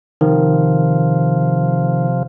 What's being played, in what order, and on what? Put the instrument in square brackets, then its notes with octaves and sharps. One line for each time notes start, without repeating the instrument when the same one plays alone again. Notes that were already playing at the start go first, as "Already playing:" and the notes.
[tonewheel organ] C3 F3 [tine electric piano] D#3